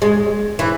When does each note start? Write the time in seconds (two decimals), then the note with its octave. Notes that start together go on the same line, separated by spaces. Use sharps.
0.02 G#3
0.59 E3